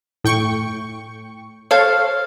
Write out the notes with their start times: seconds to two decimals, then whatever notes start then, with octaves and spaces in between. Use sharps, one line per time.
0.24 A2 G5 C#6
1.71 A4 C5 C#5 F5